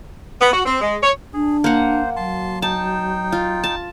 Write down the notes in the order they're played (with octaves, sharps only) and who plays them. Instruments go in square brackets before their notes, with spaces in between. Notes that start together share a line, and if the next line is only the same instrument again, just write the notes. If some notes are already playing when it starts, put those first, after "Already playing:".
[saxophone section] B3
F#4
C4
G#3
C#5
[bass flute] D4 [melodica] G#4
[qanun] A#3 F#5 [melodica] C5
[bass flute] F#3 [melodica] A5 C6
[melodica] D#4 G5 [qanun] A5
[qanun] F4
A5